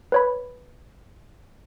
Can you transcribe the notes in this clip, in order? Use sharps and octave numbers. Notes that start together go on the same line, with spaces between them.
B4 C#5 B5